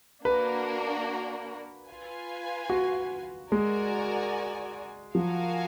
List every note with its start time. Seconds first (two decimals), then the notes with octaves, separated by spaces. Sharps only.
0.25 A#3 D4 F#4 A#4 B4
1.89 F4 B4 F5 G#5
2.70 F#4
3.52 G#3 F#4 A#4 D5 G#5
5.15 F3 F#4 A#4 F5 G#5